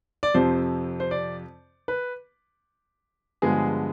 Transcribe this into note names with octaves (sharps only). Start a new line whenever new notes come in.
D5
F2 C3 F3 C5
C5
D5
B4
G2 D3 F3 G#3 B3 G#4